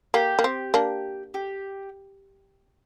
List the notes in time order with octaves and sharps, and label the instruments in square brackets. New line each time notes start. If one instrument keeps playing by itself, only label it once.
[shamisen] A#3 [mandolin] G4
[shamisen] A#3
C4
A#3 D4
[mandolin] G4